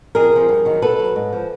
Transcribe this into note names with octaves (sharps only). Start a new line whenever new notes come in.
F2 G#4 A#4
C3 F3
G2
D#3 F#3
B2 A4 B4
F#3
G#2
F3